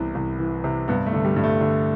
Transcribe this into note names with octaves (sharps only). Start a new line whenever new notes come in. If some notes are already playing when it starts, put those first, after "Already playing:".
Already playing: C2 C3 E3 B3
C2
E3
C3
G2 B3
A3
D3
G3
G2
A3
D3